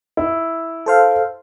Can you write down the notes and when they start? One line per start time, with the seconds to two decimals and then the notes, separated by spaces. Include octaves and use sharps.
0.17 E4
0.86 A4 C5 F5